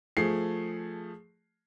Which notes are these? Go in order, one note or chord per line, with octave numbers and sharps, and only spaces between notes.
F3 A3 G#4 C7